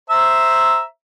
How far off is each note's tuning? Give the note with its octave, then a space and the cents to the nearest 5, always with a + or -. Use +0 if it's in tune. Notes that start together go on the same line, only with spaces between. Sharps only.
C5 +0 E5 +0 A#5 +0